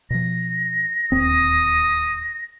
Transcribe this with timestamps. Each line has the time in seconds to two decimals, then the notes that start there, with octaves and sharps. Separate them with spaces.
0.10 B2 F3 A#6
1.12 D1 D#2 C4 D#6